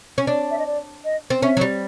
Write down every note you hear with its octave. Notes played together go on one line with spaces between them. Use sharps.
C#4
D4 D5
E5
D#5
D5
D#5
C4
C#4 E5
F#3
G3